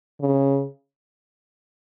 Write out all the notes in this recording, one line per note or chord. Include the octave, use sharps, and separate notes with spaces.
C#3